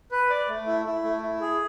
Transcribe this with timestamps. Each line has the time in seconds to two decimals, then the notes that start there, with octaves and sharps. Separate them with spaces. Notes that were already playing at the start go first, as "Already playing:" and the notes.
0.12 B4
0.30 D5
0.49 A3
0.67 E4
0.86 E4
1.04 A3
1.23 E4
1.41 G#4